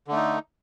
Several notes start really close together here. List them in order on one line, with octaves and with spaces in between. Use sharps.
D3 A3 D#4